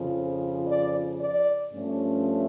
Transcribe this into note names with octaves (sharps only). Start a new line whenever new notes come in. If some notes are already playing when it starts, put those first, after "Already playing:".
Already playing: F2 C#3 F3
D5
D5
G2 F3 A3 C#4